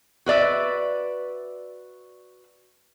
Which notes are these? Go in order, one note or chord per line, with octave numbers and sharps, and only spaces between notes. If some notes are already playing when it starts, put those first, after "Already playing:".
F#4 B4 D5 E5